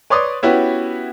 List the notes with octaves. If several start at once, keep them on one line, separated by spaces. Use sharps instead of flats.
B4 C#5 D5 C6 D6 D#6
B3 C#4 E4 F#4 G4 B4